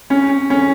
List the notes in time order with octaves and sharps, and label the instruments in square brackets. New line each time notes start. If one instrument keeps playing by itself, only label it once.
[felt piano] C#4
C#4